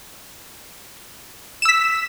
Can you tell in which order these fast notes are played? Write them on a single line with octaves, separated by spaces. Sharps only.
E7 E6 B6